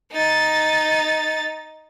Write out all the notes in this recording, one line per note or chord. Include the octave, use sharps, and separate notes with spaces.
D#4 A6